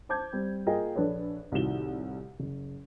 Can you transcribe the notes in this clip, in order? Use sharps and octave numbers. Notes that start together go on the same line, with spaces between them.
C5 A5 D6 G6 G#6
G3 C4
A#3 F4 G#4 A#4 D#5 G5
A#1 D4 A4 B4 C#5
C2 A2 D#3 F#4 E7 G7
F#1